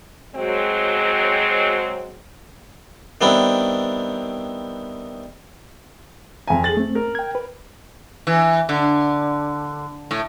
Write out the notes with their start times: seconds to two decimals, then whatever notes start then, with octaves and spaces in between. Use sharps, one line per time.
0.36 F#3 G#3 C4
3.21 D#3 G3 B3 C4 D4 E4
6.47 F2 G#5
6.64 G#4 A4 A6 F#7
6.77 A3 C4
6.95 A#4
7.15 G5 G#6
7.35 B4
8.27 E3
8.69 D3
10.11 A2